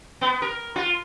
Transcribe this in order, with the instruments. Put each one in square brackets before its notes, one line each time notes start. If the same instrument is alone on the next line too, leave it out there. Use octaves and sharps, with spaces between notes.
[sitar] B3
A#4
F4